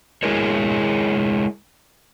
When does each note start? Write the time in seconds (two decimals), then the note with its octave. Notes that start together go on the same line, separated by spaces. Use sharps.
0.23 G#3 E4 G#4 A#4 C#5